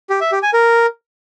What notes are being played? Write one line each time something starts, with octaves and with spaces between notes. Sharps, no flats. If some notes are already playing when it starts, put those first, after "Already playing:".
G4
E5
G4
G#5
A#4